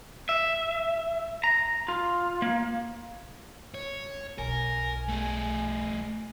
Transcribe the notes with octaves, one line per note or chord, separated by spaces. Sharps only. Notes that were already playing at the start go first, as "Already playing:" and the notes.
E5
A#5
F4
A#3
C#5
B1 A#4 G#5
A3 G#4